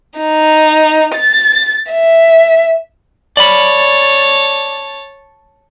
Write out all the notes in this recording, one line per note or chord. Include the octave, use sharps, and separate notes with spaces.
D#4
A6
E5
C#5 D5 A5 B5